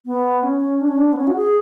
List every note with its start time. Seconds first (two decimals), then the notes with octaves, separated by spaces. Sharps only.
0.06 B3
0.43 C#4
0.81 D4
0.88 C#4
0.97 D4
1.13 B3
1.17 C#4
1.27 F#4
1.36 G#4